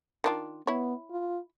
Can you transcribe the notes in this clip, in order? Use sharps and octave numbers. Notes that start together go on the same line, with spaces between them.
D#3 D4 F4
B3 E4 C#5
F4